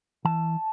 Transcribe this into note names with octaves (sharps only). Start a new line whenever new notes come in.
E3 A5